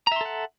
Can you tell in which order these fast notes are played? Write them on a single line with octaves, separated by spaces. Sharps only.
A#5 E5 C6 A4 F#5